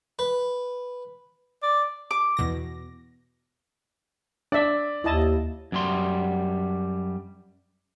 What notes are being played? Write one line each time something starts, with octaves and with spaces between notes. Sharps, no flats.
B4
D5
D6
E2 B2 A#6
D4 D5 E5
D#2 E4 D#5 A5
F#2 G3 C6